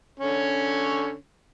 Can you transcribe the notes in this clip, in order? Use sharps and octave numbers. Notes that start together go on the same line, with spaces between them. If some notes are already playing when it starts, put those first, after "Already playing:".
D3 C#4 C#5